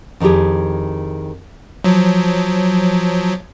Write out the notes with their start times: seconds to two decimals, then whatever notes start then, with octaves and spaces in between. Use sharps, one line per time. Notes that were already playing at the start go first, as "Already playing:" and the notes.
0.20 F2 D#3 E4 G4 G#4
1.84 F3 F#3